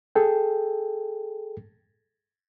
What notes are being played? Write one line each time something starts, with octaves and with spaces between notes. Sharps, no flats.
G#4 A4 G5